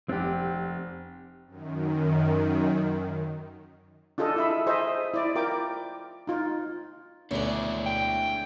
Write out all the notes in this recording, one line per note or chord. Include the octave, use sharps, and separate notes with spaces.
F1 C4 G4
F#2 D#3
D4 F4 G#4 A4 D#5
E4 E5 B5
G#4 C5 D#5 E5
E4 D5
F4 A#4 G5 D6
D#4 F4
D2 B2 D4 E4 G#4 C#5 D5
G5